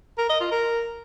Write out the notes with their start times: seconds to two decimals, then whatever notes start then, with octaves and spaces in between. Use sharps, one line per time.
0.18 A#4
0.29 D#5
0.40 F4
0.51 A#4